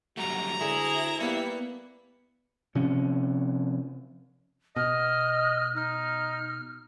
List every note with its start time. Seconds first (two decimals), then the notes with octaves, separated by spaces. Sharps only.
0.17 F#2 G3 A3 F#4 A#5
0.61 D2 E4 G#4
1.20 G3 A#3 B3
2.75 C3 F3 C#4
4.76 B2 D#5 F6
5.75 D#4 F6